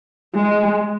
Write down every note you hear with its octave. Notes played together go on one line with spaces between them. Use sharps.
G#3